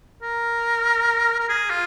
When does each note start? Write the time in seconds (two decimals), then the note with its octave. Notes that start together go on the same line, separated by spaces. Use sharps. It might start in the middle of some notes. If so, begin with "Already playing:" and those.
0.22 A#4
1.40 A#4
1.49 G#4
1.70 F4